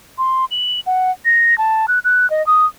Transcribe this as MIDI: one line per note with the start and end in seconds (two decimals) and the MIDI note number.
0.18 0.45 84
0.51 0.80 102
0.86 1.11 78
1.25 1.57 94
1.58 1.86 81
1.88 1.99 90
2.04 2.29 90
2.30 2.45 75
2.47 2.66 87